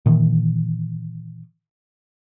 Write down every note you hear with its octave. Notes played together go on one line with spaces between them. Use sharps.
A#2 D#3 E3